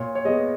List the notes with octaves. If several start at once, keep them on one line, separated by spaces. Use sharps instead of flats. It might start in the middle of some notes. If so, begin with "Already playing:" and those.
Already playing: A#2 C#5
C#5
G#3 B3 D#5